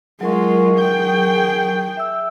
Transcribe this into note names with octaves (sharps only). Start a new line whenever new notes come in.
F#3 G#3 F4 A#4 C#6
G#4 G5
E5 E6